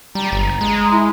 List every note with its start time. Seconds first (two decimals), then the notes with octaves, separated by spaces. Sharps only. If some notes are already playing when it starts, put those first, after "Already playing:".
0.15 G3 A#5
0.32 G1 A#5
0.61 G#3
0.92 E4